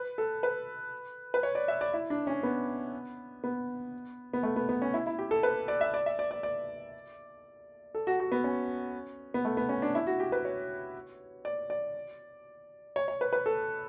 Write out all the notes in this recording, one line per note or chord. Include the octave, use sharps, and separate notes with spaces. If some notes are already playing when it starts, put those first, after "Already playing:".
Already playing: B4
A4
B4
B4
C#5
D5
E5
D5
E4
D4
C#4
B3
B3
B3
A3
B3
B3
C#4
E4
E4
G4
A4
B4
D5
E5
D5
E5
D5
D5
D5
A4
F#4
F#4
B3
C#4
B3
A3
B3
C#4
D4
E4
F#4
G4
B4
C#5
D5
D5
C#5
C#5
B4
B4
A4